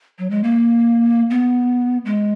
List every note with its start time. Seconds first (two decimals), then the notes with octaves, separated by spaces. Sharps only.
0.18 F#3
0.30 G#3
0.43 A#3
1.30 B3
2.05 G#3